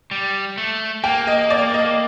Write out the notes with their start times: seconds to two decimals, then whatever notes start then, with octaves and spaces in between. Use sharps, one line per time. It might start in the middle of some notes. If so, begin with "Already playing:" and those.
0.11 G3
0.58 A3
1.04 A#3 G5
1.27 D#5
1.50 D5
1.74 D#5